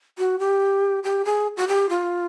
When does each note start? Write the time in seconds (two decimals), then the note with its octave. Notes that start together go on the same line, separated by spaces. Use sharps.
0.18 F#4
0.39 G4
1.04 G4
1.25 G#4
1.57 F#4
1.68 G4
1.89 F4